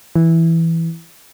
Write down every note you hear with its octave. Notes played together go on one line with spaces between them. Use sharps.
E3